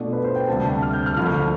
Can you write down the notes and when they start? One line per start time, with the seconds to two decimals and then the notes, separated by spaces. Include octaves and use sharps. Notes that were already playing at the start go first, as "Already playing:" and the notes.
Already playing: B2 A3 D4 F4
0.13 B4
0.24 C5
0.36 G5
0.48 D2 C3 G3 A5
0.65 A5
0.82 F6
0.93 G6
1.06 F6
1.17 D2 D3 F3 F6